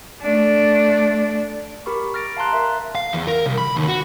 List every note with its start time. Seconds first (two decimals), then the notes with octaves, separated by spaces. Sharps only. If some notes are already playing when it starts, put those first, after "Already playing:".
0.21 A3 D4
1.86 G4 A#4 B5 C#6
2.14 F6 A6 A#6 D7
2.37 F5 A5 A#5 C6 F#6
2.53 A#4 E5
2.95 F5
3.13 E2
3.27 A#4
3.46 C2
3.58 B5
3.76 D#2
3.88 F#4